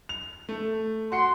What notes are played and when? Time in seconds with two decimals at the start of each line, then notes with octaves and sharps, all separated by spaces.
0.09 F7
0.49 A3
1.12 F#4 C6 C#7